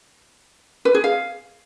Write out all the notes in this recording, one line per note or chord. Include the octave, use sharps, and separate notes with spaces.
B4
G#4
F5